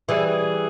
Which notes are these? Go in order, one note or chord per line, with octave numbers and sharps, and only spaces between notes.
E3 G3 G#4
G#4